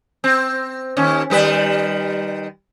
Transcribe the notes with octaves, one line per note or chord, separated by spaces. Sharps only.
C4
D#2 C#4
D#3 G3 B4